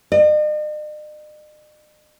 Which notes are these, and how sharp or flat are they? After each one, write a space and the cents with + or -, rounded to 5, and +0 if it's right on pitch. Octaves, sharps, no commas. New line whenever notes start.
D#5 -45